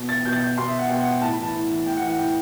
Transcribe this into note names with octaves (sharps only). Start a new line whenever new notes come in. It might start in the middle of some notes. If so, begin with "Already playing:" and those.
Already playing: B2
A6
B2 G6
A6
G6
B2 C6
E5
F#5
B2 G5
F#5
G5
A2 A5
B5
E3 A5
A2
E3
A2 G5
F#5
E3
F#5
A2 G5